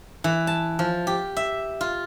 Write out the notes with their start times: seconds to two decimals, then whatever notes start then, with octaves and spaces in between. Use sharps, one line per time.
0.24 E3
0.47 A5
0.79 F3
1.07 G4
1.36 E5
1.81 F4